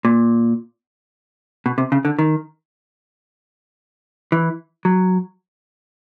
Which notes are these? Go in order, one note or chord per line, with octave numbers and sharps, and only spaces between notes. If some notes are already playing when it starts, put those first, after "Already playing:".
A#2
B2
C3
C#3
D3
D#3
E3
F#3